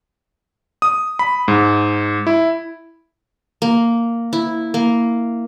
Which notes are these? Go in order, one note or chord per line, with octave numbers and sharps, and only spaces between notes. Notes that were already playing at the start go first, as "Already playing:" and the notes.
D#6
B5
G#2
E4
A#3
E4
A#3